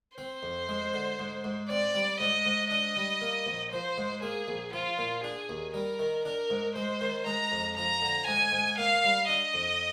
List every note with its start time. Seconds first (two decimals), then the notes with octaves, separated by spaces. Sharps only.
0.18 C4 C5
0.43 F2
0.69 G#3
0.94 D3
1.19 G#2
1.44 G#2
1.70 C4 D5
1.95 G3
2.20 G#2 D#5
2.46 G#2
2.71 D4 D#5
2.96 G3
3.21 A#3
3.47 A#1
3.72 F3 C5
3.98 G#2
4.23 A#3 G#4
4.48 A#1
4.73 F3 F4
4.98 A#2
5.24 D4 G#4
5.49 D#2
5.74 G3 A#4
5.99 D#3
6.25 D4 A#4
6.50 G#2
6.76 G#3 C5
7.01 D#3
7.26 G#3 A#5
7.52 F2
7.77 F3 A#5
8.02 D3
8.27 G#2 G#5
8.52 G#2
8.78 A#3 F5
9.04 G3
9.29 D4 D#5
9.54 F2